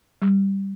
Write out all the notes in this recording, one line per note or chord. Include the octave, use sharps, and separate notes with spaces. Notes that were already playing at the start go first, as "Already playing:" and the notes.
G3